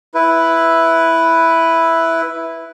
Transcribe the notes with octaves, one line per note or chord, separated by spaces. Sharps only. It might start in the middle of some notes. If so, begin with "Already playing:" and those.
E4 B4